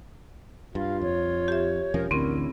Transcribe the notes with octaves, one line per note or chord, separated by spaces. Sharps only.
G2 F4 F5
F2 C#5
G4 E5
E1 F3 C#4 A#4
A1 D2 D3 C4 C#4 E4 A#4